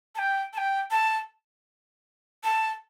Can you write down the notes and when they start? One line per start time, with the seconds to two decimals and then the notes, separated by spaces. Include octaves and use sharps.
0.15 A5
0.18 G5
0.53 A5
0.58 G5
0.91 A5
2.43 A5